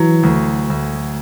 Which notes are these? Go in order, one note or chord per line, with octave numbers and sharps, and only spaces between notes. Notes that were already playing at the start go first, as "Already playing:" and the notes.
Already playing: E3 F#3
D2
D2